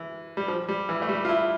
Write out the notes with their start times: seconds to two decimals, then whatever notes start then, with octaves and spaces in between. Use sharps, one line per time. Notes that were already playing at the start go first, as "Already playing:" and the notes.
Already playing: E3
0.37 G3
0.48 F3
0.68 G3
0.89 E3
1.02 A3
1.09 G3
1.25 F4
1.29 E4